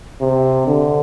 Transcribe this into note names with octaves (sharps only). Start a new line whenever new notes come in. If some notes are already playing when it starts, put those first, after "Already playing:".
C3
D3